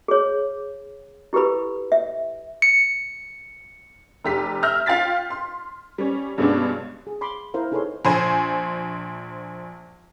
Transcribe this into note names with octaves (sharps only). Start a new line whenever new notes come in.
G#4 C#5
E4 G4 A4 B4 B5
E5
C#7
F1 G4 B6
E5 F6 G6 A#6
F4 F5 G5 A6 B6
C6
G3 C#4
G2 B2 G#3 B3 C#4 D4
G#4
B5 C6 D6
E4 A#4 C5 F5
D#4 G#4 A4 B4 C#5 C6
A#1 C5 G#5